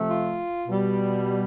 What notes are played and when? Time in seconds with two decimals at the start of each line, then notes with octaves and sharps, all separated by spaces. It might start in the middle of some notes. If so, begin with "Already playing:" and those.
Already playing: C3 F3 A3
0.09 F4
0.68 B2 G3